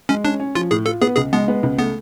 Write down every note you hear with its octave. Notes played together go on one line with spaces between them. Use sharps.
G#3 C#4
C#4 D4
C#4
F3 F4
A2 G#4
F4 A4
B3 G#4
C#2 G#4
G#3 B3
B3
C#2
A3 B3